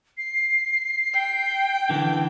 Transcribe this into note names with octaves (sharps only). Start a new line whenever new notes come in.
C7
G5
D3 E3